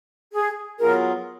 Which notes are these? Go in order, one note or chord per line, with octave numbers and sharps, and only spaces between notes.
G#4
F#3 B3 F4 G#4 A#4